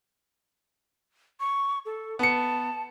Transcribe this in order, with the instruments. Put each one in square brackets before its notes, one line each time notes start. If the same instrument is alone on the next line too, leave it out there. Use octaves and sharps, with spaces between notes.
[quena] C#6
A4
[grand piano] B3 C#7 [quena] A5